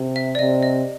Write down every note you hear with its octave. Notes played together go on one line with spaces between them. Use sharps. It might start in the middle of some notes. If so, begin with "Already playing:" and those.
Already playing: C3
E5
D5
C3 D#5
D#5